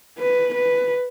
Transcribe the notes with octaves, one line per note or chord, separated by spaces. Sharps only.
B4
B4